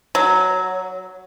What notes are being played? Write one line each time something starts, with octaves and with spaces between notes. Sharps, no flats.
F#3